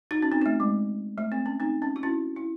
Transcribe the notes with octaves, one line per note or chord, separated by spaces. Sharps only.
D#4 F#4
C#4
C4 D#4
C4
A3
G#3
A3
C4
C#4
C4 D#4
C#4
F#4
C#4 E4
E4